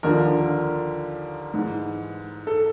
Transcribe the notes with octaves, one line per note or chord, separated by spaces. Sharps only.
D#2 D3 F3 A#4
G#2 E3
A4